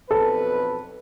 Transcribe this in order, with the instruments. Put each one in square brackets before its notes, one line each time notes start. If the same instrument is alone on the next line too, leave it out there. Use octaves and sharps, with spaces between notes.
[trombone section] B1 F2 B4 [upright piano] A4